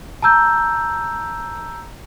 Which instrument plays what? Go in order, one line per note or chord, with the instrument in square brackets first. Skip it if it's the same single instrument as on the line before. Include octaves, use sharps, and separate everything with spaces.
[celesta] A5 A#5 E6 G6